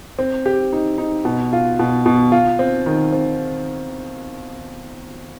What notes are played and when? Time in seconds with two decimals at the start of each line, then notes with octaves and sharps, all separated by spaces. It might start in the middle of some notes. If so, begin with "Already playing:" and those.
0.19 C4
0.46 G4
0.72 D#4
0.98 D#4
1.25 B2
1.53 F4
1.79 B2
2.06 B2
2.32 F4
2.59 C4
2.86 D#3
3.12 C4